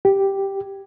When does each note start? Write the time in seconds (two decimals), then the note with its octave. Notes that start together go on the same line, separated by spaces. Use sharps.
0.05 G4